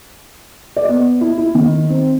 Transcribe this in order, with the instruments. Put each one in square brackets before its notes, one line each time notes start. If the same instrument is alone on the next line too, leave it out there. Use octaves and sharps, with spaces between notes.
[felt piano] D5
B3
E4
E4
D#3
C4